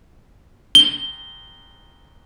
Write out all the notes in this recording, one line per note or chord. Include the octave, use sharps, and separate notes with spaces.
G7